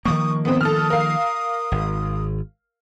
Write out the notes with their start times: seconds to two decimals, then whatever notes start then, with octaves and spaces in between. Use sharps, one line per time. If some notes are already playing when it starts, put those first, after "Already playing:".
0.05 D#3 F3 A#3 C#6 D#6
0.45 B3 C4 D#6
0.61 A4 D#6 F6
0.90 A#4 F5
1.72 G#1